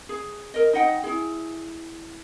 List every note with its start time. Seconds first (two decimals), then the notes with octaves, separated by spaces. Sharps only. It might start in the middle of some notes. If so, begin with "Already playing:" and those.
0.09 G#4
0.54 A#4 D#5
0.73 D#4 D#5 F#5 G5
1.04 E4 G#4